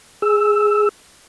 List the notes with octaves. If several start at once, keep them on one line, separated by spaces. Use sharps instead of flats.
G#4 E6